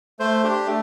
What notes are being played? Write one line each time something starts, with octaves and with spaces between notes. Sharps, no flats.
A3 C5
D4 G4
A3